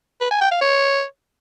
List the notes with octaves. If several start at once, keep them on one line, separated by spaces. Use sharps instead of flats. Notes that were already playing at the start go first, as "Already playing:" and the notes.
B4
G#5
G5
F5
C#5